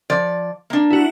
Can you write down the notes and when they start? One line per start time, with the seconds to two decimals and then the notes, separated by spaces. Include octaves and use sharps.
0.10 F3 D5
0.70 A#3 D4
0.91 E4 F#4